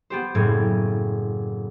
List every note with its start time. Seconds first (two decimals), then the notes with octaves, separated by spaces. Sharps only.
0.10 B3 G4 C5
0.35 F#1 A2 G#6